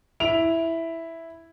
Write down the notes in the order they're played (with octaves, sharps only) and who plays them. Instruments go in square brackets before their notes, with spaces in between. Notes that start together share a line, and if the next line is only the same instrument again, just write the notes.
[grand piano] E4 D7 F7